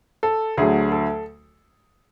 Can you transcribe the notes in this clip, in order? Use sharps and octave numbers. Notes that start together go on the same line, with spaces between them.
A4
D2 D3 F#3 A3 G#4
A4